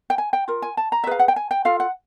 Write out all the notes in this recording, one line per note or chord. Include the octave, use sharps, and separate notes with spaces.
G5
G#5
G5
F4 A#4
G#5
A5
A#5
E5
F4 G#4 B4 F5
F#5
G5
G#5
G5
F4 A4 F5
F#5